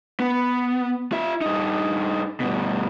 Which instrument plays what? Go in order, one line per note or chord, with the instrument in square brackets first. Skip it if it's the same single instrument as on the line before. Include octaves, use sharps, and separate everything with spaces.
[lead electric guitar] B3
F4 E5
G2 D#4
G2 B2